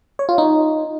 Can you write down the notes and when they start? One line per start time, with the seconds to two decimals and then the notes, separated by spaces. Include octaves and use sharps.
0.19 C#5
0.29 F4
0.38 D#4